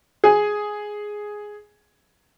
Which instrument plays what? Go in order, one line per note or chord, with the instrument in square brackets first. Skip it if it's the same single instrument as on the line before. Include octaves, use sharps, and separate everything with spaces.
[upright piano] G#4 G#5